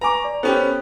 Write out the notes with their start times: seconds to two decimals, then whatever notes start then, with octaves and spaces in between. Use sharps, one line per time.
0.01 B4 G#5 A#5 C#6 D6
0.24 D5
0.43 B3 C#4 G4 A4 C5